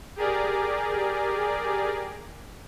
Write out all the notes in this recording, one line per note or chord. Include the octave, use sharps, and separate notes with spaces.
G4 G#4 A#4 D5